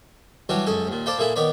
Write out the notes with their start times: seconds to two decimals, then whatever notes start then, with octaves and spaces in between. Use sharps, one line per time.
0.49 E3 F#3 G3 D4 F#4 C#5
0.66 C#2 F#2 A4 G#5 C#6
0.87 D#2 A#2
1.06 A4 C5 D5 F5 G5 B5
1.18 A#2 A#3 E4 G#4 A4
1.36 D#3 B3 C#5 D5 B5